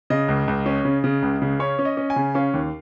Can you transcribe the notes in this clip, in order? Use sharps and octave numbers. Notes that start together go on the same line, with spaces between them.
C#3 D#5
C#2
C#2
C#4
C#3
C#3
C#2
C#3
C#4 C#5
C#4
D#5
C#4
G#5
C#3
C#4 F5
D#2